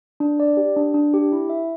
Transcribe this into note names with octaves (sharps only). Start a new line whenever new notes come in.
D4
D5
G4
D4
D4
G4
E4
E5